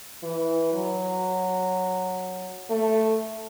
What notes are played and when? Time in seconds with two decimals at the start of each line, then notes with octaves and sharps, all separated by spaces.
0.23 E3
0.73 F#3
2.70 A3